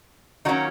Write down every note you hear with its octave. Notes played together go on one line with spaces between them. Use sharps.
D#3 F#3 A#3 C#4 D#4 F#4